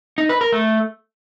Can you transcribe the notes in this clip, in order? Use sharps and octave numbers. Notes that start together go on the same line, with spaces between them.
D#4
B4
A#4
A3